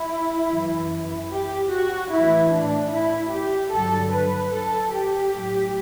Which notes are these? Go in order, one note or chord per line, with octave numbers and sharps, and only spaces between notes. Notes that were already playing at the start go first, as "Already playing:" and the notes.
Already playing: E4
F#2 E3
G4
F#4
A2 E3 E4
D4
E4
G4
G2 D3 F#3 A4
B4
A4
G4
A2 F#3